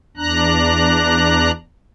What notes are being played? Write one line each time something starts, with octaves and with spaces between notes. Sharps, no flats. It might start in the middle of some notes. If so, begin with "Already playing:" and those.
E2 D4 A#5 F#6